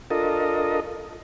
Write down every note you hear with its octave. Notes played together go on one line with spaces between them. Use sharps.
D4 F4 A4 A#4 D#5